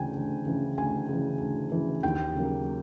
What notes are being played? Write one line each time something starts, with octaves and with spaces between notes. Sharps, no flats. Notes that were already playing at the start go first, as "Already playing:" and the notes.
Already playing: D2 C#3 E3 G5 G#5
D2
C#3 E3
D2 G#5
C#3 E3
D2
C#3 E3
D#2 G5
C#3 F#3 A#3